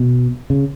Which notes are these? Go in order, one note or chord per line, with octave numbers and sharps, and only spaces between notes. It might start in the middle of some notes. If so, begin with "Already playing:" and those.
Already playing: B2
C#3